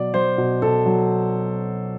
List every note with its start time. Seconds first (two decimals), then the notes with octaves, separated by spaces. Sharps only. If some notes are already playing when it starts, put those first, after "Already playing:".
Already playing: B2 F#3 D5
0.14 F#3 C5
0.38 B2
0.62 B2 A4
0.86 F#3